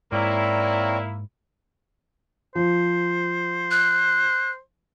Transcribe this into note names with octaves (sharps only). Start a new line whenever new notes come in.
G#2 A#3 C4 E4 C#5 D5 A#5
F3 C5
F#6